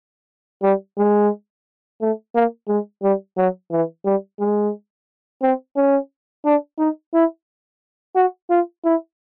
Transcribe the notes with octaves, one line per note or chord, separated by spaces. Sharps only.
G3
G#3
A3
A#3
G#3
G3
F#3
E3
G3
G#3
C4
C#4
D4
D#4
E4
F#4
F4
E4